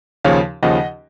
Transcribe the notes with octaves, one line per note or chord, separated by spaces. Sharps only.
D#2 C#3 F3 C#5 F5
D#2 C#3 F3 D#5 F#5